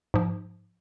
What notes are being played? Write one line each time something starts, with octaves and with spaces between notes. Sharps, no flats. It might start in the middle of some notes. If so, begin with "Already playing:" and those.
G#2 F3